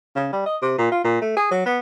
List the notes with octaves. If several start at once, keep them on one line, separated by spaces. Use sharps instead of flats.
C#3
G3
D#5
C3
A#2
F4
A#2
A3
G#4
F#3
B3